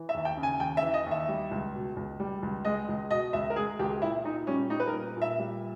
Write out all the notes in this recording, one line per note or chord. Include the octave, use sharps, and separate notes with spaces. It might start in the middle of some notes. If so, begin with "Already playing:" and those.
Already playing: E3
E5
D#2
G5
C#3
G#5
D#2 G5
E5
E3
D#5
D#2
E5
G3
C#2
B2
C#2
G3
C#2
G#3 D#5
C#2
B2 D#5
C#2 E5
A#4
G#3 G#4
C#2 G4
A#2 E4
A#2 D#4
G3 C#4
G3 D#4
B4
A#4
A#2
A#2 E5
G3